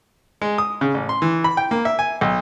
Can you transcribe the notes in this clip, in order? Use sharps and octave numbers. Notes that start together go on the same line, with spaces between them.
G#3
D#6
C#3
A1
C6
E3
B5
G5
A#3
E5
G#5
B1